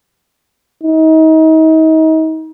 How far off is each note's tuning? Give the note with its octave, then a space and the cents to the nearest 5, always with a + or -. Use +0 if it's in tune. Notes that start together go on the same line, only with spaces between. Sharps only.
D#4 +35